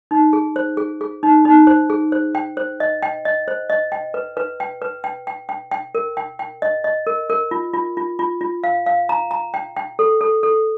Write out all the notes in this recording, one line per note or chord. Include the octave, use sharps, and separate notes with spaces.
D#4
G#4
C5
G#4
G#4
D#4
D#4
C5
G#4
C5
G5
C5
D#5
G5
D#5
C5
D#5
G5
B4
B4
G5
B4
G5
G5
G5
G5
A#4
G5
G5
D#5
D#5
A#4
A#4
F4
F4
F4
F4
F4
F5
F5
A#5
A#5
G5
G5
A4
A4
A4